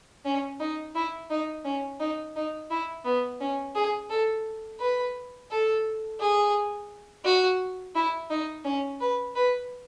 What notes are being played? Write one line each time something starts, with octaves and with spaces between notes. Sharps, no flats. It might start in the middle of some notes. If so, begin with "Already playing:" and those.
C#4
D#4
E4
D#4
C#4
D#4
D#4
E4
B3
C#4
G#4
A4
B4
A4
G#4
F#4
E4
D#4
C#4
B4
B4